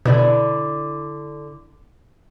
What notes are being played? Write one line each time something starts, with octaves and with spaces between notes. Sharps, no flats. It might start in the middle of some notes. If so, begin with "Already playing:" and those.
B2 D3 E4 D5